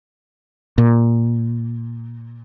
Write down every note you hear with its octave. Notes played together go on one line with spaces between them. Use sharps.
A#2